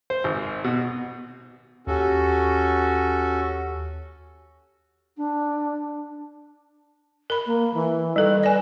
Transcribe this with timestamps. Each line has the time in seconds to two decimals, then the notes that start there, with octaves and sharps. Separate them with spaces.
0.10 C5
0.24 G#1
0.64 B2
1.87 D#2 C#4 F#4 G4 A4 F#5
5.17 D4
7.30 A#4 B5
7.46 A#3
7.74 E3
8.16 D#3 G3 A4
8.44 B4 D5 G#5